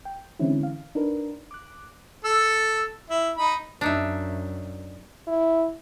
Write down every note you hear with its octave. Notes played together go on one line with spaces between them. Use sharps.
G5
D3 E3 G#3 C4 C#4 E4
F5
D4 D#4 A#4 B4
D6 F#6
A4 E6
E4
D#4 B5
F#2 D4 D#4 E5
E4